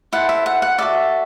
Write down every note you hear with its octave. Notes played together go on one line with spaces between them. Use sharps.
E4 A4 C5 F#5
E5
F#5
F#5
F#4 A4 D5 E5